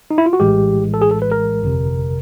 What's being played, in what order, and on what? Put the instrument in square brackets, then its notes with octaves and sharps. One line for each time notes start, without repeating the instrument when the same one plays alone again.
[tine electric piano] D#4
E4
F4
F#4
A#1 A2 E3 G#3 G4
A4
G#4
A4
B4
A#4
G1 F2 C3